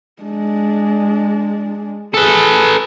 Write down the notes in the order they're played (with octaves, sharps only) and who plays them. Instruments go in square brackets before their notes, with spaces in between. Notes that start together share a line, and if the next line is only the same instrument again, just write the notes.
[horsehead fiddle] G#3 D4
[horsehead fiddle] G#4 [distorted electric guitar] A4 B4